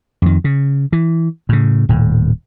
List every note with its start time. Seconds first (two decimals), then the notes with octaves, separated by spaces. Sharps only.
0.22 F2 D#3
0.44 C#3
0.93 E3
1.49 A2 C#3
1.89 D#1 A2